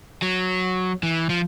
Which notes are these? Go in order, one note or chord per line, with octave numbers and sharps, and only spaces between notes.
F#3
E3
F3